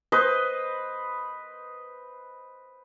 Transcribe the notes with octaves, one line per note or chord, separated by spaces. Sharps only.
B4 C5 D#5